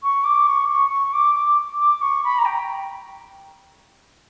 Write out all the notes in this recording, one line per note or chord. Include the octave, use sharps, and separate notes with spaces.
C#6
D6
C#6
C#6
C#6
D6
D6
D6
C#6
B5
A#5
G5